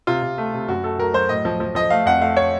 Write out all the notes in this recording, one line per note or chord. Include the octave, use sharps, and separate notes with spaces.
C3 F4
C3
A3
C3
F#2 F#4
A3 A4
F#3 A#4
F#3 C5
A2 D#5
F3
F3
F3 D#5
A3 F5
F2 F#5
A3 F5
C#5